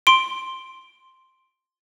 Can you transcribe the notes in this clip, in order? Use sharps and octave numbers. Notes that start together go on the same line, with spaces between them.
C6 D7